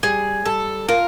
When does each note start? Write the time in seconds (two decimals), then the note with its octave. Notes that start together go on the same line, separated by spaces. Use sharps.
0.03 G3 G#4
0.46 G3 A4
0.89 F4 A#4